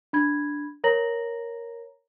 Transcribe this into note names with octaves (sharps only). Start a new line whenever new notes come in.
D4 B5 G#6
A#4 C#5 A#5 A#6 F#7